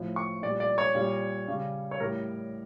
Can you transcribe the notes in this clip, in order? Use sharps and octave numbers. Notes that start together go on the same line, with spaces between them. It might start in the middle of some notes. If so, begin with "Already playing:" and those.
Already playing: A2 F3
C#6
A#2 G3 D5
D5
C#5
A#2 G3
C#3 G3
C#5
A2 G3 A#4